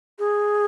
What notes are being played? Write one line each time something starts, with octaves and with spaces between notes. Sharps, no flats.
G#4